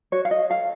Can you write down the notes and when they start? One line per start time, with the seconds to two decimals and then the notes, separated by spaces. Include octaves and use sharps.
0.12 F#4 C#5
0.25 F5
0.31 D#5
0.50 A4 F5